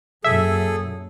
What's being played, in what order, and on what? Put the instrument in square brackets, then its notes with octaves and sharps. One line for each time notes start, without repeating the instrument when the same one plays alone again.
[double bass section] F#2 A#2 [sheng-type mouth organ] G#4 A4 [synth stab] E5